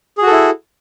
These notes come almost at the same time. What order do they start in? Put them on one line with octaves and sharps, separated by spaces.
G#4 F#4 A4 E4